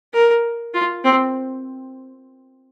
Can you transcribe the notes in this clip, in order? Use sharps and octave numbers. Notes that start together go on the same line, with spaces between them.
A#4
F4
C4